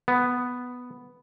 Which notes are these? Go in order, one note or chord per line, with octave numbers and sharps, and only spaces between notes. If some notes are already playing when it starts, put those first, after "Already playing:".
B3